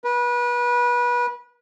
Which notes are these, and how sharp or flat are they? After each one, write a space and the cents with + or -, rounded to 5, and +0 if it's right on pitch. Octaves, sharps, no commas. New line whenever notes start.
B4 -30